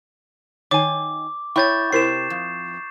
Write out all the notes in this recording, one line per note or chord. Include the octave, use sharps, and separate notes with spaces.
D#3 C#5 G#5 D6
E4 C#5 G5 C#6 G6 A6
C3 E4 A#4 C5 C7 E7
F2